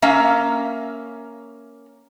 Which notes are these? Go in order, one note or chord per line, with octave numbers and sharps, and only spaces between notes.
A#3 C#4 E5 F5